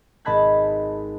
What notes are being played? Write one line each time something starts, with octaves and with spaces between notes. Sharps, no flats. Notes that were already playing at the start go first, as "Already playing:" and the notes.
G#1 D#5 A5 B5 F#6 G#6